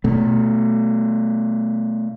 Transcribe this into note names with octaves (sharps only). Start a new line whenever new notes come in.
B2 A3